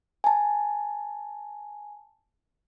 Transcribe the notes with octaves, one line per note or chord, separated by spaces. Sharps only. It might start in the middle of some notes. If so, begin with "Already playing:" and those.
G#5 A5